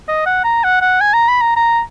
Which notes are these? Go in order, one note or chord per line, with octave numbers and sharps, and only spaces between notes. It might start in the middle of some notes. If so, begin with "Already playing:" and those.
D#5
F#5
A#5
F#5
F#5
G#5
A#5
B5
A#5
A#5